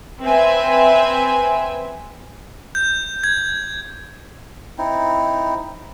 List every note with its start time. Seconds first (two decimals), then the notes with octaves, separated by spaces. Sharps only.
0.23 C4 B4 E5 G#5
2.75 G6
3.24 G#6
4.78 C4 D#4 E4